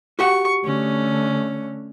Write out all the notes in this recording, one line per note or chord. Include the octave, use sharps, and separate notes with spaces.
F#4 G4 F#5 C#6
D3 A3 C#4